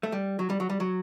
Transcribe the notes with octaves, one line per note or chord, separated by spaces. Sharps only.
A3
G3
F#3
G3
F#3
G3
F#3